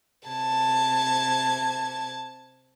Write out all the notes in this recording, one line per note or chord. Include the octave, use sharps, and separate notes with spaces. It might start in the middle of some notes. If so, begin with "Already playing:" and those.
C3 A5 G#6